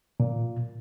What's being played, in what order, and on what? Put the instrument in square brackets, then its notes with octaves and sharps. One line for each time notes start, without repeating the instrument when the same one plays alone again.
[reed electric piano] A#2